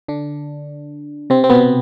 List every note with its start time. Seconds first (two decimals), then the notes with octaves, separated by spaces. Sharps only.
0.08 D3 D4
1.30 C3 C4
1.44 C4
1.50 B2 B3